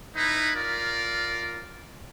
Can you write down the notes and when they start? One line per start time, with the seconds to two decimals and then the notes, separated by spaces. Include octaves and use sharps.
0.16 D#4 E4 B4
0.55 F4 A#4 D5